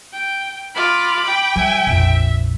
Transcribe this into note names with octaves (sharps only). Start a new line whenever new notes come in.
G5
F4 B5 D6
G5
F3 G3 E5 G#5
A#1 F2 E5